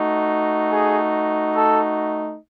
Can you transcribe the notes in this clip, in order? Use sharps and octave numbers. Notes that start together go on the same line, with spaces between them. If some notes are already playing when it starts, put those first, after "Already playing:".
Already playing: A3 D#4 F#4
G#4
A4